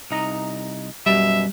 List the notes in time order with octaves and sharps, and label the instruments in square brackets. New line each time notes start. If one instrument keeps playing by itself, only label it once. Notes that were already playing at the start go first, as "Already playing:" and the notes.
[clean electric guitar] C2 D#4 A#5
[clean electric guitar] F#2 B2 [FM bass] G3 [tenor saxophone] E5